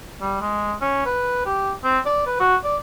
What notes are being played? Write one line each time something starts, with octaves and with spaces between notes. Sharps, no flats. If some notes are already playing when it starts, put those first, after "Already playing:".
G3
G#3
C#4
B4
G4
C4
D5
B4
F#4
D5